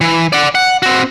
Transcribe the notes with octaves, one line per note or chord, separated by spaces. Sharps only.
E3
D5 F#5
F#5
C4 F#4